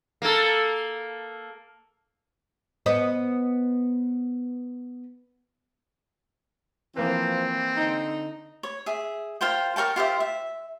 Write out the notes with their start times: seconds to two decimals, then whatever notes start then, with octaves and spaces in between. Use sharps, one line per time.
0.22 A#3 A4
2.86 B3 C5 D#5
6.96 E3 F3 A#3 C4 B4
7.77 D3 D#4
8.63 C#5
8.86 G#4 E5
9.41 F4 A#4 C5 G5
9.76 A#4 C#5 G5 A5
9.96 F4 G4 C5 E5
10.20 E5